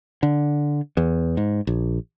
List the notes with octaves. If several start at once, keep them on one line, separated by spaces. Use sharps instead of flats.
D3
E2
G#2
A#1